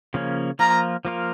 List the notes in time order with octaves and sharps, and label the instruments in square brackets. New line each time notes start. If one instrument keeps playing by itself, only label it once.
[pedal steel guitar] C#3 F3 A#3 C#4
[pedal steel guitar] F3 A#3 F4 A#4 [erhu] A#5
[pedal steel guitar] F3 A#3 F4 A#4